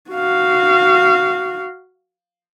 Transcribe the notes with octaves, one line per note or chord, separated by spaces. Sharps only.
F#4 F5